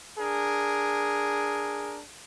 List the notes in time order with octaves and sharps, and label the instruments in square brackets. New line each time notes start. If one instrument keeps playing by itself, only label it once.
[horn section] D4 G#4 A#4